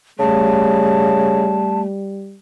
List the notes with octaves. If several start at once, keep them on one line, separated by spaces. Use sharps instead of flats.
C#3 G3 A3 A5